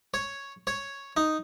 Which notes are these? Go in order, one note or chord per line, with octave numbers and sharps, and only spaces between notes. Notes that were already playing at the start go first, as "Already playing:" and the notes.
C#5
C#5
D#4